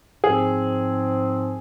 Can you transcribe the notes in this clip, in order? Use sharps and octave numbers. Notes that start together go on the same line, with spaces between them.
G#2 F3 C4 G#4